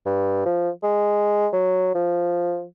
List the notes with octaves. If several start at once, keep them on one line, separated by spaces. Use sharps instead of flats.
G2
F3
G#3
F#3
F3